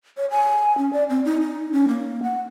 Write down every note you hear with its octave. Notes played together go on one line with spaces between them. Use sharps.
C#5
G#5
C#4
D5
C4
D#4
D#4
C#4
A#3
F#5